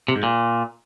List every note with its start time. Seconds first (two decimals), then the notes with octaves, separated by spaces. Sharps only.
0.08 C3
0.16 G#2
0.23 A#2